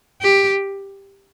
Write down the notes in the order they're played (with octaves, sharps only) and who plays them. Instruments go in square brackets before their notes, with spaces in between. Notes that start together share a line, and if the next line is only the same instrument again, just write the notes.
[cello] G4